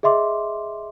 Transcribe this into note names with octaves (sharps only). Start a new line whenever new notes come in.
G#4 D#5 E5 C6 D6